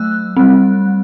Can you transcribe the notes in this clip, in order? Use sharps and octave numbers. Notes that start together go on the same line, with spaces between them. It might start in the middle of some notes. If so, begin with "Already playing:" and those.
Already playing: F#3 A3 E6 F#6
G3 C4